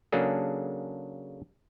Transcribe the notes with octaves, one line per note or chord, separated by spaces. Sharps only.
C#3 F#3 A#3 D4 G#4 A4